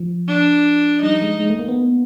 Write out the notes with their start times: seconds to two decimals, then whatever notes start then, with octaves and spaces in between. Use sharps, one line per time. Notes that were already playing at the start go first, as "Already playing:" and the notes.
Already playing: F3
0.28 D4
1.03 G3 D#4
1.22 G#3
1.40 G#3
1.50 A3
1.59 A#3
1.68 B3